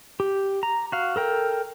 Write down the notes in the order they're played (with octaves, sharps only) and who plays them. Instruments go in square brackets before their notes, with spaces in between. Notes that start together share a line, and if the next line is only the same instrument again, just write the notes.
[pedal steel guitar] G4
A#5
F#4 F5
A4 A#4 G5